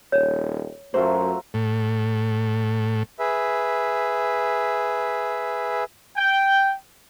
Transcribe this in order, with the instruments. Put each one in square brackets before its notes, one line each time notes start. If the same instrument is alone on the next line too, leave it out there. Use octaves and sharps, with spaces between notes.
[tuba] D#1 [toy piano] C#5
[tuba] F#2 [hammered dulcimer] F#3 A3 F4 [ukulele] C5
[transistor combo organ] A2
[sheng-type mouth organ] G#4 B4 E5
[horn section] G5